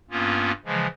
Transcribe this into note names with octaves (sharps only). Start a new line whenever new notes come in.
G2 A#3 B3 C#4 F4
C#3 E3 F3 G#3